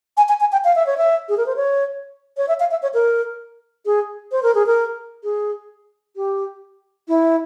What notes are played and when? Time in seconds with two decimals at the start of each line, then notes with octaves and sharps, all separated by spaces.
0.17 G#5
0.29 G#5
0.40 G#5
0.52 G5
0.64 F5
0.75 E5
0.86 C#5
0.98 E5
1.29 G#4
1.37 A#4
1.46 C5
1.56 C#5
2.37 C#5
2.48 E5
2.60 F5
2.71 E5
2.82 C#5
2.94 A#4
3.86 G#4
4.32 C5
4.43 A#4
4.55 G#4
4.66 A#4
5.23 G#4
6.16 G4
7.08 E4